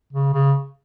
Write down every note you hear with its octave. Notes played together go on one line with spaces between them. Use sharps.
C#3
C#3